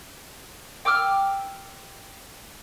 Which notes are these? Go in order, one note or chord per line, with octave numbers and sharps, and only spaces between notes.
G5 D6 E6 F6